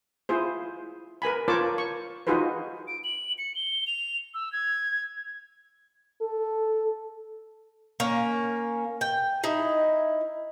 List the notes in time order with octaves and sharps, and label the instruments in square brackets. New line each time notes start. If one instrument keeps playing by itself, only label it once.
[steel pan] E4 F4 G#4 C5
A#4 B4 G#5 B5
F4 A#4 C5 C#5 A5 D6
C#6
D#4 F4 F#4 G#4 B4 C5
[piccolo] D7
F#7
C#7
G7
F7
E6
G#6
[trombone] A4
[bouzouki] A#3 C#4
G5
D#4 E4